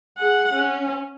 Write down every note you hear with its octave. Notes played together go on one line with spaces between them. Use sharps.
G#4 F#5
C#4